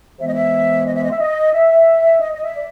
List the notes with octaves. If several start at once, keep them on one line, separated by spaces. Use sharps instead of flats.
C3 E3 G#3 B3 E5
D#5
E5
D#5
E5
D#5
E5
D#5
E5
D#5
D#5
E5
D5